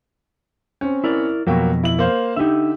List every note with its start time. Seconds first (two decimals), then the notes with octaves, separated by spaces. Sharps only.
0.81 C4 C#4
1.04 E4 A#4 D5
1.47 F2 B2 F#3 A#3 G5
1.83 E4 F#7
1.99 A#3 C5 F5
2.36 D3 D#4 G4 E5